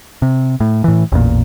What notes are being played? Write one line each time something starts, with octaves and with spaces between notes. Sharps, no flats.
C3
A2
A2 E3
A1 E2 A#2